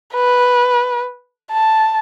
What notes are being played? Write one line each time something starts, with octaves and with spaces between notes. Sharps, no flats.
B4
A5